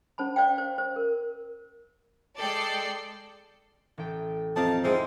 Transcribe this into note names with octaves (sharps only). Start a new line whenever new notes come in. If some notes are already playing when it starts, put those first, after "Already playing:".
C#4 C5 A5 B5
C5 D5 F5 G5
C5
C5
A#4
G#3 A4 D5 G5 C7
A1 A4 G5
F2 D#4 D5 F5 A5
G#2 G#3 C4 E4